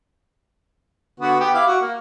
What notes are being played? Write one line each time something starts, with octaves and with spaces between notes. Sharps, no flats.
D3 B3 F#4
B3 G4
E4 F5 D6
F#4
A#3